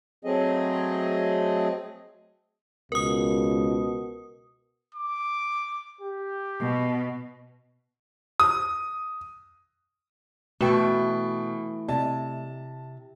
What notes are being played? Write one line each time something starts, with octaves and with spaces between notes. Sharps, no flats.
F#3 A3 C4 G#4 D#5
C#2 B2 A#4 D#6
D6
G4
B2
D#6
B2 E3 A3 F#4 G5
C3 D5 D#5 A5